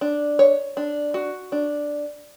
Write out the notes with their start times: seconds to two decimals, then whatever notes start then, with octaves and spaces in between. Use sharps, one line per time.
0.01 D4
0.39 C#5
0.77 D4
1.14 F#4
1.52 D4